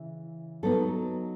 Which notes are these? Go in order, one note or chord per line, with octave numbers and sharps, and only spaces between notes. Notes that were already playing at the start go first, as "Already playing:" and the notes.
Already playing: C#3 E3
F#3 B3 D#4 A4